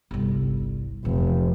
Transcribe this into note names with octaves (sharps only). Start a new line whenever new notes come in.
G1 C2
F1 E2